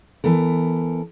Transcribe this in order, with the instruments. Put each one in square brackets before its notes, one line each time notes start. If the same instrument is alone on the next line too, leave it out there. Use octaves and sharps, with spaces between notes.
[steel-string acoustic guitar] E3 B3 A4 A#4